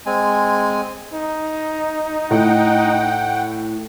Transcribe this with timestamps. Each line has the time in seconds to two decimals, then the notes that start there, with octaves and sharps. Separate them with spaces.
0.06 G#3 C4 G#5
1.13 D#4
2.31 A2 F#5 G5